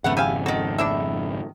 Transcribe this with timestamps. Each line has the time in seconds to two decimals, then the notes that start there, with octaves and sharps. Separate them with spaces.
0.04 G#1 F2 C#3 A3 B3 F#5
0.17 G4 E5 F5 G#5
0.46 D#3 F#4 A4
0.78 D4 E4 E5